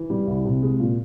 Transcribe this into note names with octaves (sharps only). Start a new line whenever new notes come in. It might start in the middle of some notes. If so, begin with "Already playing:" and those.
Already playing: E3
G3
C2
C3
G#3
A#2